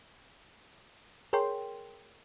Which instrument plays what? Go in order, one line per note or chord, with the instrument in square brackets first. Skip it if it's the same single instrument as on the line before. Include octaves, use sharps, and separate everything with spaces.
[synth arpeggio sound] G#4 A#4 C#5 G5 C6